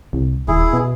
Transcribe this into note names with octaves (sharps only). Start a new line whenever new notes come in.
C2
D#1 E4 G#4
B2